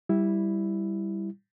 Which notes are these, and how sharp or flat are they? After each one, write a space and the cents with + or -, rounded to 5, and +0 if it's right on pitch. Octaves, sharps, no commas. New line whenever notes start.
G3 +0 E4 +0